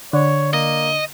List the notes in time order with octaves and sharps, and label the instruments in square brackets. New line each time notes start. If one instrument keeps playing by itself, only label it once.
[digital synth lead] D3 [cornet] C#5
[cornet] A#3 [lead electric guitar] D#5